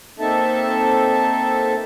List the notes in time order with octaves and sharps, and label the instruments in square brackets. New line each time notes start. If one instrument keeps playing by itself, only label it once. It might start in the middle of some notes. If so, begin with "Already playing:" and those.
[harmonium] A#3 C4 D#4 A4 E5 A5